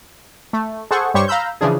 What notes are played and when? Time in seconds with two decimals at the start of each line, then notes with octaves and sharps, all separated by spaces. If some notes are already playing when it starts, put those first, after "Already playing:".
0.53 A3
0.91 G#4 A4 C5 F#5 C#6
1.14 G2 G3 G4 C5 C#5 C#6
1.28 F5 A#5 B5 E6 G6
1.61 C#3 E3 F3 D4 G#4